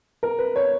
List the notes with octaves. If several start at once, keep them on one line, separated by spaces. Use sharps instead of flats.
A#4
B4
C#5